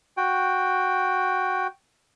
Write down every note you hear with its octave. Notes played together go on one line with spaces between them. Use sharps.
F#4 G5